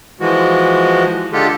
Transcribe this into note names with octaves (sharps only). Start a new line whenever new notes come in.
E3 F3 G#3 F#4
D3 G#3 F4 G4 A4